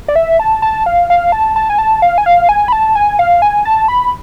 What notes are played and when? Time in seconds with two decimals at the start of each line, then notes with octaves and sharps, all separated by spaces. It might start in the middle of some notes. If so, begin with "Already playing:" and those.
0.08 D5
0.16 E5
0.39 A5
0.62 A5
0.86 F5
1.10 F5
1.32 A5
1.56 A5
1.70 G#5
1.79 A5
2.02 F5
2.18 G#5
2.26 F5
2.49 G#5
2.68 B5
2.72 A5
2.95 G#5
3.19 F5
3.42 G#5
3.65 A5
3.88 B5